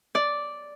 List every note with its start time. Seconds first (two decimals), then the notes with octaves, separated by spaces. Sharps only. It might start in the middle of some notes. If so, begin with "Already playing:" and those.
0.15 D5